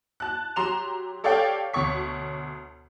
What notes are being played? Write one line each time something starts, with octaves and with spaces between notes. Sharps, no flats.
A5 F#6
F#3 G4 A#5 C6 E7 F7
G4 A4 C#5 D5 F5 G5
D2 B2 C#5 C#6 B6